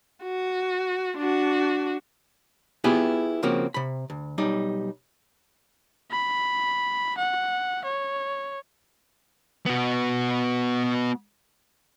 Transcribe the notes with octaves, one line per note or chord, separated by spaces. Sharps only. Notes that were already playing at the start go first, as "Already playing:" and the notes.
F#4
D4 F#4
B3 E4 F4 G4 G#4 B4
C#3 F3 A#3 C4 F#4
C3 B5
D2
B1 G3 D#4
B5
F#5
C#5
B3 F#4